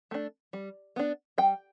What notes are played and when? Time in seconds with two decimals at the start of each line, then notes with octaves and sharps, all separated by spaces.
0.11 A3 D4
0.53 G3
0.96 B3 D4
1.38 G3 G5